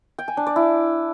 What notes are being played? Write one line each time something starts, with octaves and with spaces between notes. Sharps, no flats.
G5
G#5
D4
D5
E4